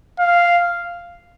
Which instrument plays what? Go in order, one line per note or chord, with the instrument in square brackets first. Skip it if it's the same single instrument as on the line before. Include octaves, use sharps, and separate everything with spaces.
[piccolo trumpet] F5